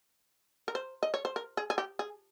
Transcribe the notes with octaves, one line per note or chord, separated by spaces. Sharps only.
A#4
C5
D#5
C#5
C5
A#4
G#4
G#4
G4
G#4